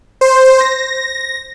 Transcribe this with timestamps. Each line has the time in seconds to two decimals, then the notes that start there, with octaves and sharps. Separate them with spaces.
0.21 C5
0.60 A#6